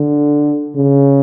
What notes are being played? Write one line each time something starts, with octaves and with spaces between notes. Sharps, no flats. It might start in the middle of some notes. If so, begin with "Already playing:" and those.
Already playing: D3
C#3